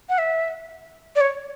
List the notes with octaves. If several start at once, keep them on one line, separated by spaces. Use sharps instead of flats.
F#5
E5
D5
C#5